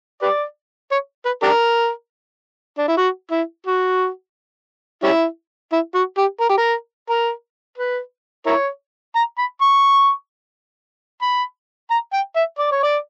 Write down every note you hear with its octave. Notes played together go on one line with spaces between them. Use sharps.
G4 B4 D5
C#5
B4
D4 G4 A#4
D4
E4
F#4
E4
F#4
G3 C#4 E4
E4
F#4
G4
A#4
G4
A#4
A#4
B4
E4 A#4 C#5
A#5
B5
C#6
B5
A#5
G5
E5
D5
C#5
D5